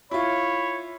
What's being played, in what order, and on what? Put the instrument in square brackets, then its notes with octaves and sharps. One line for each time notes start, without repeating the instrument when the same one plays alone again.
[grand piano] E4 F4 [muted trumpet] C#5 [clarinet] B5